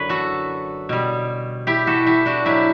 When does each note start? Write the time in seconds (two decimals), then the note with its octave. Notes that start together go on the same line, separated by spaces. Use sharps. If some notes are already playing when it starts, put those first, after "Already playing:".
Already playing: F#2 D3 F#3 B4 C#5
0.09 F#4 A4
0.89 B2 G3
1.67 E4 G4
1.87 F#4 A4
2.06 E4 G4
2.26 D4 F#4
2.46 B2 F#3 E4 G4